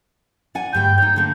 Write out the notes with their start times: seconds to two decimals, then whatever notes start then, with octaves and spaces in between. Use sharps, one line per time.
0.55 D5 F#5 G#5
0.73 D2 G2 G5 G6
0.98 D#4 C#5
1.16 D3 A#3